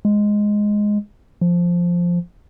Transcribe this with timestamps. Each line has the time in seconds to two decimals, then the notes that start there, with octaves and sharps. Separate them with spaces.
0.05 G#3
1.41 F3